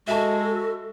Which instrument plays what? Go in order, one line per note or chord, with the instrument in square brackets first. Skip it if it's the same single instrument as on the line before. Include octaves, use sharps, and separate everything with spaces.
[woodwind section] G#3 [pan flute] F#4 [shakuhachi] A4 [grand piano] E5 A5